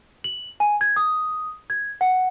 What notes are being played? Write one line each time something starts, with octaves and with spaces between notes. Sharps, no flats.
F#7
G#5
G#6
D#6
G#6
F#5